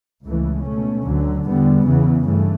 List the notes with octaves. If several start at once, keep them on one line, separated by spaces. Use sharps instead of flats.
C#2 C#3 E3 A3
B2 A3 C#4
D2 D3 F#3
E2 D3 G3 B3
E2 C#3 E3
G2 E3 A3